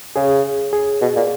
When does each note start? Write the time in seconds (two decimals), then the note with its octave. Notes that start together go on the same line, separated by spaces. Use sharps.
0.16 C#3 G#4
0.73 G#4
1.01 B2
1.16 A#2